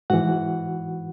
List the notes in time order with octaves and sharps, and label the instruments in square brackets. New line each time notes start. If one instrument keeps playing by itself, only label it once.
[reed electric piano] G#2 E3 F#4 F#5